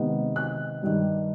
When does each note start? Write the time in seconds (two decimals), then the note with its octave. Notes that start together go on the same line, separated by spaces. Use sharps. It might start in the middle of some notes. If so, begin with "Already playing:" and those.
Already playing: C3 D#3 G#3 B3
0.36 F#6
0.83 G2 D#3 G3